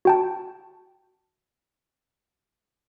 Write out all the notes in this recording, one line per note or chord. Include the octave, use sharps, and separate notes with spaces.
F#4 G5 A5